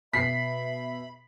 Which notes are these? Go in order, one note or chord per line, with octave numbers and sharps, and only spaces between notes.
B2 E5 B5 B6 C7